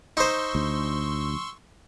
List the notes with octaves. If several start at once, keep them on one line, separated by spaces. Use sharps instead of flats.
D#4 C5 C6 C#6 E6
D2